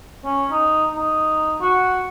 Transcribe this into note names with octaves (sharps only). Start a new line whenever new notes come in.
C#4
D#4
D#4
F#4